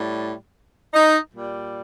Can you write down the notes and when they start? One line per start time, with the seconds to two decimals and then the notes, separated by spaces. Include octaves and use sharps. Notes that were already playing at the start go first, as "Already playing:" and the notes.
Already playing: A2 G3
0.93 D#4
1.32 A#2 G3